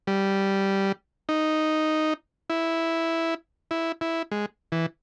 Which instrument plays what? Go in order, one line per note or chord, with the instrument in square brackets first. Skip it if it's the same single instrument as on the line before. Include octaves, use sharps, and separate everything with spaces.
[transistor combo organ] G3
D#4
E4
E4
E4
G#3
E3